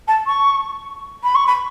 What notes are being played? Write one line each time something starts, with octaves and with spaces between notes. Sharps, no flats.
A5
C#6
B5
C#6
B5